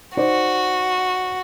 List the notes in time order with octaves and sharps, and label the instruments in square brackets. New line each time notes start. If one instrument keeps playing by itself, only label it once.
[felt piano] D#4 C5 D5 [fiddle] F#4